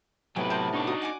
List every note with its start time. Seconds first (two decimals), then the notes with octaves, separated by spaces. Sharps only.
0.36 A2 C3 F#3 B3 B4 G5 G#5
0.50 A#4 G5 A5 C6 G6
0.74 D4 D#4 D5 C#6
0.87 F#4 A#5 D#6
1.02 F#5 G#5 D6